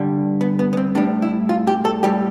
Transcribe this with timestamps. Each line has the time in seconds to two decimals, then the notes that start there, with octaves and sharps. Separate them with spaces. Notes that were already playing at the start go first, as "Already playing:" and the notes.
Already playing: G2 D3 G3
0.41 B3
0.59 B3
0.73 B3
0.77 C4
0.95 A2 G3 D4
1.22 E4
1.49 F4
1.67 G4
1.85 A4
2.03 A2 G3 G4